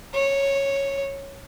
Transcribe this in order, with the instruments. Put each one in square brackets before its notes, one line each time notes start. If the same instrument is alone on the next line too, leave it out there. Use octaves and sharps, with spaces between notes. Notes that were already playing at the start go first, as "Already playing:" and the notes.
[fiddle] C#5